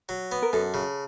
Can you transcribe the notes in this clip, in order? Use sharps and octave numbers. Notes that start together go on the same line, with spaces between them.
F#3
B3
A#4
F#2 A4
C#3